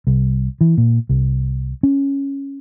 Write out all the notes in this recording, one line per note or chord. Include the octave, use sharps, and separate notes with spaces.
C2
E3
A#2
C2
C#4